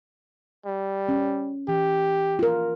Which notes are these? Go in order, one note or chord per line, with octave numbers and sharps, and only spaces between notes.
G3
C#4
E3 G4
F4 A#4